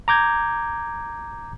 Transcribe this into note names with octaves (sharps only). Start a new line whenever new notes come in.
A#5 D6 G6 G#6